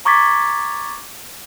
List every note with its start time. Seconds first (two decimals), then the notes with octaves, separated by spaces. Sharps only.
0.05 A#5 C#6 D6 G#6 A6 B6